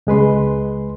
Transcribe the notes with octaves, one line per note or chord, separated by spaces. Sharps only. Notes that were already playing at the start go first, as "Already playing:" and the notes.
C#2 G#3 B4 C6